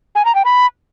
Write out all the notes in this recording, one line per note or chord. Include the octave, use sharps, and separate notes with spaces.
G#5
A#5
G5
B5